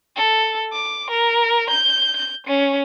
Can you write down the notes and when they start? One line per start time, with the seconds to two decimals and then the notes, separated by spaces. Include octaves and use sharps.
0.16 A4
0.72 D6
1.10 A#4
1.70 G6
2.16 G6
2.47 C#4